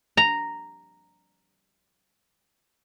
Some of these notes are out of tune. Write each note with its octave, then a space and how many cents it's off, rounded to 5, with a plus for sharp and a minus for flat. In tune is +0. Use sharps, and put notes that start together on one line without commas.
A#5 -5